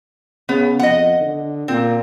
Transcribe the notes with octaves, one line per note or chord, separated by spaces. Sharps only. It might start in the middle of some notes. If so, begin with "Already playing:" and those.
C#3 B3
F2 D#5 F#5
D3
A#2 C4